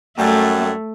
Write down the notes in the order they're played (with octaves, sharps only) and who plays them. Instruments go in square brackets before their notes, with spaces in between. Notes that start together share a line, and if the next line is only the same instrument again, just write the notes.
[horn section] F#2 G3 [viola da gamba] A3